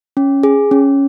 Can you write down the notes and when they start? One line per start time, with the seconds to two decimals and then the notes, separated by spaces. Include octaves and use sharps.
0.17 C#4
0.43 G#4
0.71 C#4